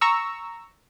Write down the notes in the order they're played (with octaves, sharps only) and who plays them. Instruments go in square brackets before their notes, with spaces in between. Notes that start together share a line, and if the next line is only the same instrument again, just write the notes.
[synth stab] A#5 C#6 E6